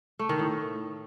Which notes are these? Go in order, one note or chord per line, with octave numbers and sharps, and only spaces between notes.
A3
D#3
A2